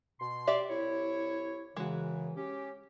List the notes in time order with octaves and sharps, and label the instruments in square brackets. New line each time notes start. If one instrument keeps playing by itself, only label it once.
[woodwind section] B2 C6
[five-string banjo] G4 D5 E5
[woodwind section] C2 E4 C#5
[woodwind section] F#2 C#3 E3 [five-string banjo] G#3 F#4
[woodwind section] C#4 G4